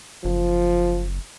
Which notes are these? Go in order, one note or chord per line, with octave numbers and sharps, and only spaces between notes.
F#1 F3